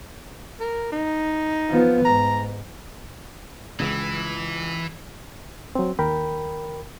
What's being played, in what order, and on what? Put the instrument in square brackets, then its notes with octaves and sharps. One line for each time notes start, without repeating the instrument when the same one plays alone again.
[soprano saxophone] A#4
D#4
[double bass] F3 B3
[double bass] G#2 [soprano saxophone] A#5
[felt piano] C#2 [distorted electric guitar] E3
[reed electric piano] F#3 C4
D#2 A#4 G5 B5